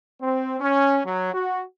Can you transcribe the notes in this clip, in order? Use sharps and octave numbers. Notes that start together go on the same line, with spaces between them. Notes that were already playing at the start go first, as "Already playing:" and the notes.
C4
C#4
F#3
F#4